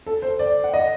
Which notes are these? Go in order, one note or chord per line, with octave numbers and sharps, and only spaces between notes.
A4
C5
D5
F#5
D#5